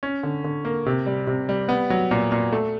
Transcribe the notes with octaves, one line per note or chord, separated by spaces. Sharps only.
C#4
D3
D3
A#3
C3
G3
C3
G3
B3
F#3
A#2
A#2
A3